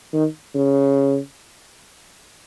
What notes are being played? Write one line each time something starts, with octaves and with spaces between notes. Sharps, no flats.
D#3
C#3